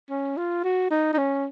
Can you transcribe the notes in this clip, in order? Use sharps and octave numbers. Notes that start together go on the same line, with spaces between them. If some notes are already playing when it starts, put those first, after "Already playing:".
C#4
F4
F#4
D#4
D#4
C#4